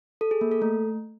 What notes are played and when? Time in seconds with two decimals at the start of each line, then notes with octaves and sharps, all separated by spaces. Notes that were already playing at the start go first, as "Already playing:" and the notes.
0.21 A4
0.31 G#4
0.41 A#3
0.51 A4
0.62 A3